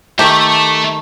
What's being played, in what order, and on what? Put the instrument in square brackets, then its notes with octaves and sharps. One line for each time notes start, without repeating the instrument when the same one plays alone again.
[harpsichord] D#3 A3 [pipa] G4 [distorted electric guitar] A4 E5